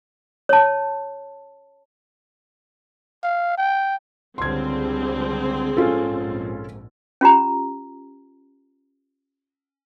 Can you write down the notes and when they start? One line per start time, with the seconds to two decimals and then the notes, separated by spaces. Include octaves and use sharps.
0.49 C#5 A5
3.23 F5
3.58 G5
4.38 C#2 D3 G3 C4 G#4 C6 G#6
5.77 A#1 G#2 C#4 F4 A4
7.21 C#4 F4 G4 A#5